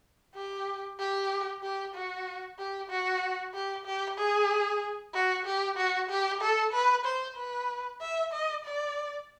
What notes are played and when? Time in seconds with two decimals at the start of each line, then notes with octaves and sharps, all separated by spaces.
0.35 G4
0.99 G4
1.63 G4
1.95 F#4
2.59 G4
2.90 F#4
3.54 G4
3.85 G4
4.18 G#4
5.14 F#4
5.46 G4
5.77 F#4
6.09 G4
6.41 A4
6.73 B4
7.05 C5
7.36 B4
8.01 E5
8.32 D#5
8.65 D5